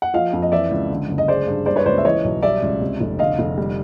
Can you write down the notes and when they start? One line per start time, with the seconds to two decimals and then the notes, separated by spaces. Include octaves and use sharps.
0.02 F#5
0.14 F3 D#5 F5
0.33 F2
0.42 D#5
0.52 E3 D5 E5
0.71 C#2
0.90 D3
1.09 F#1
1.18 D#5
1.28 G#3 C5 D5
1.47 G2
1.66 G3 C5 D5
1.76 B4 C#5
1.86 C#2 C5 D5
1.98 E5
2.04 E3 C#5 D#5
2.24 B1
2.43 G3 D5 E5
2.62 C#2
2.81 C3
3.01 F1
3.19 D3 D#5 F5
3.39 F1
3.58 G3